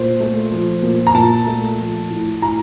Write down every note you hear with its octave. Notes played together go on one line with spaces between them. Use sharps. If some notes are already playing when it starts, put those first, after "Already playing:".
Already playing: A#2 C5
A3
F3
A#2
A#5
A#2 A5
A3
F3
A2
A2 A#5